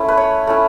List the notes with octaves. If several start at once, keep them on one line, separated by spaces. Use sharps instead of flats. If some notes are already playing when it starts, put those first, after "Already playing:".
Already playing: A3 C#4 E4
B4
C#5
A3 C#4 E4